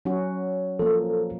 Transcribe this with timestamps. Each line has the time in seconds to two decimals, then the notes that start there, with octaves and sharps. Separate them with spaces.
0.05 F#3 C#4 F#4
0.79 F3 A#3 A4